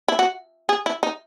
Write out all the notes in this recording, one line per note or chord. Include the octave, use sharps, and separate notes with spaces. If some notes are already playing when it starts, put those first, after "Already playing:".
E4
F#4
G#4
E4
D#4